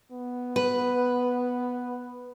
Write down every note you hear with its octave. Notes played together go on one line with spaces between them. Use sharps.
B3
B4